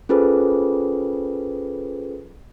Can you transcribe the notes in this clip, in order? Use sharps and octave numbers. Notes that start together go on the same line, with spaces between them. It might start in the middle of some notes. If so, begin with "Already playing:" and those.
C#4 F4 G#4 A4 B4 C5